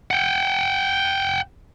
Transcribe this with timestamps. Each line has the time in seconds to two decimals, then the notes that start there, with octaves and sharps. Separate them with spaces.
0.11 F#5 G5